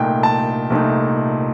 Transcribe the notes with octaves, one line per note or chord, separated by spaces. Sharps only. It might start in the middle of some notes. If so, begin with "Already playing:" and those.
Already playing: C2 A#2 A3 D#4 G5
A5
C2 A#2 A3 D#4